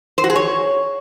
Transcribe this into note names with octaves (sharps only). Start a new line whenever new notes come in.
C5
F#4
G#4
C#5